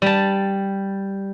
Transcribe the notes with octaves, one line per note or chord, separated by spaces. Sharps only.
G3 A5